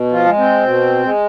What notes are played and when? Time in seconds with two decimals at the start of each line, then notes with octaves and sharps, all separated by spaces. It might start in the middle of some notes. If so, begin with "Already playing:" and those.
Already playing: B2
0.12 F3 F4
0.25 G#3
0.37 C4
0.64 B2
1.03 G#3